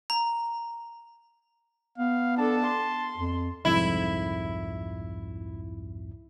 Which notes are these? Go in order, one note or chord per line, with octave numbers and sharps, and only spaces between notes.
A#5
B3 F5
D4 A4 A5
C6
F2
C2 F2 G#2 E4